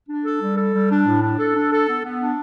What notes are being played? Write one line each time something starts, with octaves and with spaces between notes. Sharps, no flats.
D4
A4
G3
A4
G3
D4
A2
D4
A4
D4
A4
B3
B3
D4